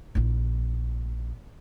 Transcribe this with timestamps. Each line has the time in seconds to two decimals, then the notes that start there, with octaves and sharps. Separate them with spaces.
0.15 A#1 E4